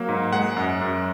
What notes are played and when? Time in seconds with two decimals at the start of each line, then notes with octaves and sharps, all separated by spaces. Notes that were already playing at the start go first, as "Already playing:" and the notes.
Already playing: F#3 A#3
0.09 G#2
0.33 G#3 F#5
0.57 F#2
0.81 F#2